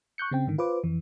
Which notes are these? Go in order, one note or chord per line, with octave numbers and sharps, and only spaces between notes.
C#6 F#6 G6 C#7
C#3 C4 G5
G#2 D3 D#3
F4 B4 C5 D6
F2 E3